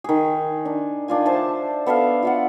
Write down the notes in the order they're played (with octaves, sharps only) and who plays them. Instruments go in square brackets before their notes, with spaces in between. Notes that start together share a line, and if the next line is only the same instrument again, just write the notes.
[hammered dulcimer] D#3 G#4
D4
D#3 D4 F4 G#5
C5 E5 A5
B3 A4 E5 F5
F4 E5 F#5